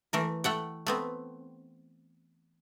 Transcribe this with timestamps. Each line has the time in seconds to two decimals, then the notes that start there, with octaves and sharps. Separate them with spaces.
0.13 E3 A3 A#4
0.44 A3 F#5 G5
0.86 A3 B3 C4